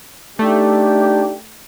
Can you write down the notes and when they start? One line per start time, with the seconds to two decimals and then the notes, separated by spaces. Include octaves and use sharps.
0.39 A3 D4 D#4 G4